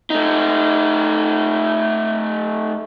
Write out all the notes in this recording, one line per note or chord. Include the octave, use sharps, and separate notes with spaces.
A3 D#4